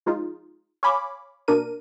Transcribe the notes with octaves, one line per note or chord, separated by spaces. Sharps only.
F3 G#3 D#4 F4
C#5 F5 G#5 B5 D6
B2 A#3 D4 A#4 D#7